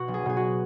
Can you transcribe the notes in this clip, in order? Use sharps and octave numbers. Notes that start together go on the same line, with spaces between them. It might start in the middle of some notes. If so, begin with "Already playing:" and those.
Already playing: B2 F#4
B1
G#4
B2 G#4
F#4